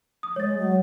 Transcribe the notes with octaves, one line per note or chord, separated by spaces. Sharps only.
D#6
G#3 C#5 A6
F#3